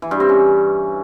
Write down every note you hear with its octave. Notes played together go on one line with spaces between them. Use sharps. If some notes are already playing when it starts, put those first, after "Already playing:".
E3
G2
C4
C#4